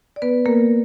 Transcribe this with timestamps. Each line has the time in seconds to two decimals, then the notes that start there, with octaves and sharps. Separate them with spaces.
0.16 D5
0.22 B3 B4
0.46 A#3 A#4